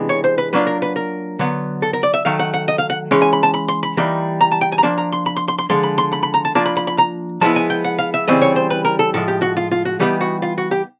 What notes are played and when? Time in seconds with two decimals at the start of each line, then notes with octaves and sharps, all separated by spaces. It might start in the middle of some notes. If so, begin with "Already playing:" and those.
Already playing: C3 E3 G#3 B3 D4
0.09 C#5
0.24 C5
0.38 B4
0.53 F#3 A#3 D4 F4 B4
0.67 A#4
0.82 B4
0.96 A#4
1.39 D3 F#3 B3
1.82 A4
1.93 A#4
2.03 D5
2.14 E5
2.25 D#3 F#3 A3 F5
2.39 F#5
2.54 F#5
2.68 D#5
2.78 F5
2.90 F#5
3.11 E3 G#3 C#4 G5
3.22 G#5
3.33 B5
3.43 A5
3.54 B5
3.68 C6
3.83 B5
3.97 E3 G3 A#3 D#4
4.41 A#5
4.52 A5
4.61 G5
4.72 G#5
4.78 A#5
4.83 F3 A#3 D4 A5
4.98 A#5
5.12 C6
5.26 B5
5.37 C6
5.48 C6
5.59 C6
5.69 D3 F3 G#3 C6
5.83 B5
5.98 C6
6.13 B5
6.23 B5
6.34 A#5
6.45 A5
6.55 F3 A#3 D4 F4 A5
6.66 B5
6.77 B5
6.87 B5
6.98 A#5
7.41 F3 G#3 B3 E4 A5
7.56 G#5
7.70 G5
7.85 F#5
7.99 F5
8.14 E5
8.28 C#3 E3 G3 C4 D#5
8.42 C#5
8.56 C5
8.70 B4
8.85 A#4
8.99 A4
9.14 A2 F3 G#3 A4
9.28 G4
9.42 F#4
9.57 F4
9.71 F4
9.85 F#4
10.00 E3 G3 B3 D#4 G4
10.21 F#4
10.42 F4
10.58 F#4
10.71 G4